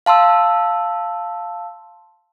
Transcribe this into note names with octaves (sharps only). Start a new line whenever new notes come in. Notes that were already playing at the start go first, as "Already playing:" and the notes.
F5 A5 C6 E6